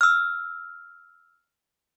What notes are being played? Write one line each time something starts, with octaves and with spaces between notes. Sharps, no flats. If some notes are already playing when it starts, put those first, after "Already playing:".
E6 F6